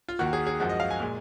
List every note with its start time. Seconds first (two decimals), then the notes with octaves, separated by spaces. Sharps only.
0.08 F4
0.19 D#2 D#3 A#3 F#4
0.33 G#4
0.47 G#4
0.60 F#2 F3 G#3 F#4
0.69 D#5
0.80 F5
0.90 G#5
1.00 A#2 G#3